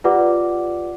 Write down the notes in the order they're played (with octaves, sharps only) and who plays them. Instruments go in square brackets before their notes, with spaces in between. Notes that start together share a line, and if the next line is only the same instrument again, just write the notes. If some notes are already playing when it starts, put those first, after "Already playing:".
[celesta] F4 G4 B4 D5 F#5 D6